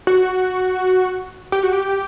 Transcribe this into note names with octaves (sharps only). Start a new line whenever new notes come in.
F#4
G4
F#4
G4